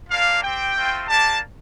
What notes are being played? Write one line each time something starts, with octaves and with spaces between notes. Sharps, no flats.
A#3 D4 F4 F5
C4 G4 G5
A3 C4 F4
A#3 D4 G4 A5